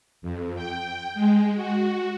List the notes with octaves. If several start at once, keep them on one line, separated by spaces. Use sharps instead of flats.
F2
G5
G#3
F#4